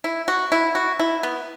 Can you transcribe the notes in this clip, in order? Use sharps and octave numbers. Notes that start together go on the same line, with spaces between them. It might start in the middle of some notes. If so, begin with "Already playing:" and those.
E4
F#4
E4
F#4
E4
B3